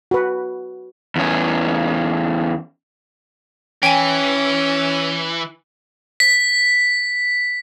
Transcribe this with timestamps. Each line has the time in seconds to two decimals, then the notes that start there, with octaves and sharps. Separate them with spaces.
0.11 F#4 B4
1.16 E2 C#4
3.83 E3 C#4 G5 G#5
6.20 B6